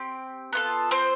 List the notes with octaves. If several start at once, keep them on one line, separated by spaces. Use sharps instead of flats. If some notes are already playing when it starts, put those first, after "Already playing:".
Already playing: C4 G4
B3 F4 A4
C4 C5